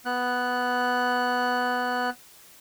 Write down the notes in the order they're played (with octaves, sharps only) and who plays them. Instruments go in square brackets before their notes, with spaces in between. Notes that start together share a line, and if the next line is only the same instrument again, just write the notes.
[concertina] B3 F#6